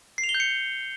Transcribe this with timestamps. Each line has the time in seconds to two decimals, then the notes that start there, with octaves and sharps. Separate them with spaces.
0.18 C7
0.24 F7
0.29 G7
0.34 G6
0.40 C#7